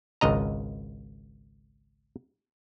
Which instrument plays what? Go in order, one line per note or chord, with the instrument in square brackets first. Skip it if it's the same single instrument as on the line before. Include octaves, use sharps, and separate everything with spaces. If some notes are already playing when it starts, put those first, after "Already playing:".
[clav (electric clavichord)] G#1 C#2 D#5 A#5